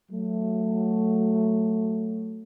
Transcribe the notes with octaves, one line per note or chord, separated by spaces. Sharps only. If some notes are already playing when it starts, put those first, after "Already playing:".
F#3 A3